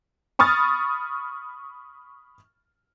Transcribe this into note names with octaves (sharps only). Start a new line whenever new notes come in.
B5 C#6 D#6 F6 A6